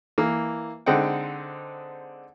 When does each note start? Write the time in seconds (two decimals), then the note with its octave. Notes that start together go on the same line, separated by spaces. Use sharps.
0.18 E3 A#3
0.86 D3 G#3 C4 D#4 F#5 G5